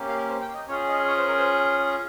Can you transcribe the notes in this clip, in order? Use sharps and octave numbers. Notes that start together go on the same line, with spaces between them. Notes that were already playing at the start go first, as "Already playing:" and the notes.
Already playing: A#3 C#4 G4
F5
A#4
C5
G5
D#5
C#4 F4 G#4 C#5
D#5
C#5
C5
A#4
C5